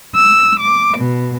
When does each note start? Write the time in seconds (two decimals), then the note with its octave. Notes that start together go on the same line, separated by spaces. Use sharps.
0.15 E6
0.59 D6
0.96 B2